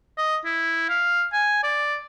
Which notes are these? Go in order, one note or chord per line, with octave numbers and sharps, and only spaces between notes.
D#5
E4
F5
G#5
D5